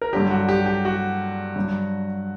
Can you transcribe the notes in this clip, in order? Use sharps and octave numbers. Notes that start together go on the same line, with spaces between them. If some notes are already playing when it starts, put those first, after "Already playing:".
A#4
G2 D3 F#3 G4
F#4
G4
G4
F#4
G2 F#3